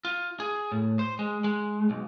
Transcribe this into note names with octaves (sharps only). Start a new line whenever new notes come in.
F4
G#4
A2
C5
G#3
G#3
B1